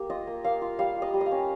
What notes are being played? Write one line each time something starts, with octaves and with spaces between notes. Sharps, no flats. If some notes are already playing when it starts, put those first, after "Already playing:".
Already playing: A#3 G4
F4 D#5
A#3
A#3 F5
F4
G3 F5
F4
D#5
G3
D#5
F5
C#4